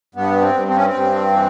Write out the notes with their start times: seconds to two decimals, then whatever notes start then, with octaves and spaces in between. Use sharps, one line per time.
0.15 G2 B3
0.42 C4
0.54 G2
0.67 C4
0.76 C#4
0.86 C4
0.94 G2
1.32 E3